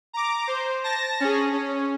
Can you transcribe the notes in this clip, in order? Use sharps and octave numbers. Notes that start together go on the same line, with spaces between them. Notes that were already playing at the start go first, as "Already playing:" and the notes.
A#5 D6
C5
A5 A#6
C#4 G#4
C#4